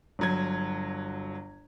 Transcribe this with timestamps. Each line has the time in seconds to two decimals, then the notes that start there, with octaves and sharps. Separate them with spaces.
0.19 G1 F#3 G#6